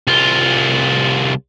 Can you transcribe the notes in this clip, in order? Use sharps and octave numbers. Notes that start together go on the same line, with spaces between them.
C2 F4